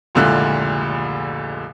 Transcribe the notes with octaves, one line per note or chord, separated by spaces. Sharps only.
F1 C#2 A#2 D3 E4 F#6